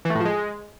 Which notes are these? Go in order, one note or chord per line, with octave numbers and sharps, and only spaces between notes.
E3
A3
A2
F3
G#3